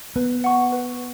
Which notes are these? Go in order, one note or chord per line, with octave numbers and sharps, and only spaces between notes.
B3 B4
F#5 C#6
B4